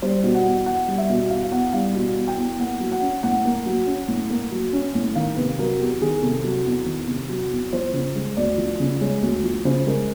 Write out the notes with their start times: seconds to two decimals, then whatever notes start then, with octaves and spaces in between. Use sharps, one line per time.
0.02 G3 C5
0.24 B2
0.34 F#5
0.45 E2
0.66 E2 F#5
0.88 G3
0.98 E5
1.10 B2
1.30 E2 F5
1.43 F5
1.52 E2 F#5
1.73 G3 F5
1.94 B2
2.16 E2
2.27 G5
2.38 E2
2.59 A#3 F#5
2.80 F#3
2.92 F#5
3.02 C#4
3.23 A2 F#5
3.45 A#3
3.66 F#3
3.87 C#4
4.08 A2
4.30 A#3
4.51 F#3
4.73 C#4
4.95 A2
5.15 D#3 F5
5.36 C3 B4
5.59 F#3 A#4
5.79 E2 G4
6.02 D#3 G#4
6.23 C3 A4
6.44 F#3
6.65 E2
6.86 D#3
7.08 C3
7.29 F#3
7.51 E2
7.73 F3 C5
7.93 C#3
8.15 G#3
8.37 D2 D5
8.58 F3
8.80 C#3
9.01 G#3 C#5
9.22 D2
9.44 F3
9.65 C#3 C5
9.86 G#3 A#4